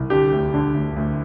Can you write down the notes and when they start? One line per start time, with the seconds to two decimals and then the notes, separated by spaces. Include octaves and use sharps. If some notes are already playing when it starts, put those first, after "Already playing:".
Already playing: C2
0.10 D3 G4
0.32 D2
0.54 D3
0.74 D2
0.96 D2